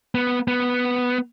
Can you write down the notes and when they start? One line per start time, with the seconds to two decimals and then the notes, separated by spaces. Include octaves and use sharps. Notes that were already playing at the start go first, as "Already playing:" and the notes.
0.15 B3
0.48 B3